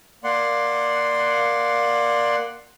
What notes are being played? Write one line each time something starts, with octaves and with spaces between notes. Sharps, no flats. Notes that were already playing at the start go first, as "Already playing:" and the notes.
A#3 D5 F#5 C6